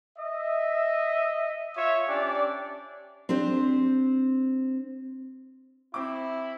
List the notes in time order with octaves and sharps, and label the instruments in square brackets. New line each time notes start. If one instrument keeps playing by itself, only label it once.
[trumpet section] D#5 E5
F4 C#5 E5
C#4 D4 G4 D5
[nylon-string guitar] C4 D4 G4 C5
[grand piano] C4 D6 [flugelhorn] E4